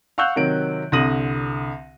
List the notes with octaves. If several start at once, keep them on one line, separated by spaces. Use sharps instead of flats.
F5 F#5 C#6 E6 F#6 G6
C3 D#3 F#3 D7
C2 D3 D#6 A#6 D#7 F#7